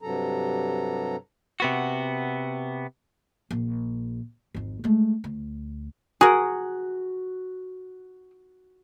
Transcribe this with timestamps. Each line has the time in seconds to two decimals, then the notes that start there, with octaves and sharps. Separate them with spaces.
0.02 G2 C3 F#3 A4 A#5
1.60 C3 B3 F#4
3.51 A#1
4.55 G#1 F2
4.84 G#3 A3
5.24 D2
6.21 F#4 G#4 A#4